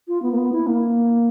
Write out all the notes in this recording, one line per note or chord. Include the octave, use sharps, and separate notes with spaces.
F4
B3
A#3
B3
E4
A#3